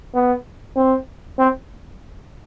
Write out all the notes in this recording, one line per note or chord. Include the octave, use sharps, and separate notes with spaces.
B3
C4
C4